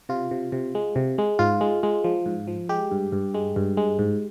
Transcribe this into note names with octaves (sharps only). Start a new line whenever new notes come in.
C3 F4
C3
C3
G#3
C3
G#3
G#2 F4
G#3
G#3
F3
G#2
F3
G#3 G4
G2
G2
G#3
G2
G#3
G#2